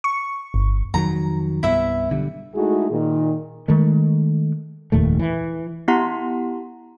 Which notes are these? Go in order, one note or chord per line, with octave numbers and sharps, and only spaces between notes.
C#6
G1
F2 D#3 F#3 A#5
C2 G2 B3 E4 E5
B1 D3 G3
G#3 A3 D#4 E4 F#4 G#4
A#2 D#3
D#3 G#3 A3
F1 D#2 A#2 A3
E3
B3 E4 G4 F#5 A#5 C6